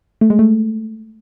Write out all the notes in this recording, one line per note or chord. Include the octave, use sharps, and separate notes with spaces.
A3
G#3
A3